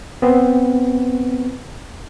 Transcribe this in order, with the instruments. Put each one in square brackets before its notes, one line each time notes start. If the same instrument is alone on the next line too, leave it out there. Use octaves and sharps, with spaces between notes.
[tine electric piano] B3 C4